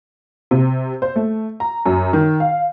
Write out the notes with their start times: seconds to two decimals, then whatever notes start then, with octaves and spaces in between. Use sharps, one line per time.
0.51 C3
1.02 C5
1.16 A3
1.60 A#5
1.86 F#2
2.13 D#3
2.40 F5